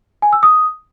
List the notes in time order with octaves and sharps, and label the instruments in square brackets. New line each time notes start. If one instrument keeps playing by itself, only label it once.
[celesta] G#5
E6
D#6